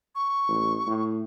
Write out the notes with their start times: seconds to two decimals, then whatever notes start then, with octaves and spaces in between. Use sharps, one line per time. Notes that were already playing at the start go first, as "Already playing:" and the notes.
0.15 C#6
0.48 A1
0.86 A2